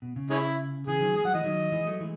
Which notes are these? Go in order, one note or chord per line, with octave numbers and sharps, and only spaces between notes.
B2
C#3
G#3 C#4 E4
C#3 E3 G#4
D#3 F#3
G#3 G#4
F#3 F#5
E3 G#3 D#5
D#3 F#3
E3 G#3
F#3 A3
E3 G#3